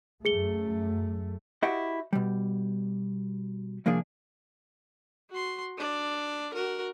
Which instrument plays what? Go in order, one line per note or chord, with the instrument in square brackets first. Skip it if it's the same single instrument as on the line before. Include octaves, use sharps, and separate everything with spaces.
[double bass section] F#2 A3 [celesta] G#4 C#7 G7
[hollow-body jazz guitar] E4 F#4 G4 D#5 F#5
B2 G3
C2 F3 A#3 D4 G#4
[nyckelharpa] F#4 C6
D4 D5
F#4 A#4